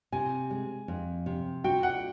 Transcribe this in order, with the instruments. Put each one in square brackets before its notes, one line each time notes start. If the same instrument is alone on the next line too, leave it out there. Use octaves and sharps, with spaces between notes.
[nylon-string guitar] C3 [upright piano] G#5
[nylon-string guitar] G#3
F2
C3
[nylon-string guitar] F#4 [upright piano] G5
[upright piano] F#5